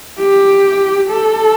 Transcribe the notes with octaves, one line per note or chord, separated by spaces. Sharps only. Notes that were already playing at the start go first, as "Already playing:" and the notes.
G4
A4